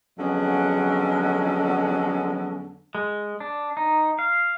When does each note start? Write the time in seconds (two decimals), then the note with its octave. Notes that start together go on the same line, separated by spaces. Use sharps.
0.18 F2 D3 F#3 G#3 B3 C#4
2.95 G#3
3.40 D4
3.77 D#4
4.19 F5